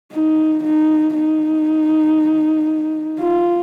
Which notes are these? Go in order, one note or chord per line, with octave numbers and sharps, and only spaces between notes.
D#4
D#4
D#4
F4